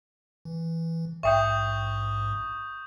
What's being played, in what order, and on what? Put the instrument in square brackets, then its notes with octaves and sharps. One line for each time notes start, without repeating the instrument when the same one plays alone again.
[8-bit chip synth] E3
[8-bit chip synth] A#1 G#2 [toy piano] E5 G5 [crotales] C#6 D#6 G6